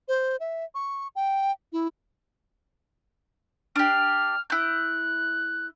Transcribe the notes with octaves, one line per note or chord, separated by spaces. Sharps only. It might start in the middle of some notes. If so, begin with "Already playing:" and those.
C5
E5
C#6
G5
E4
D4 G4 F6
E4 F#6 G6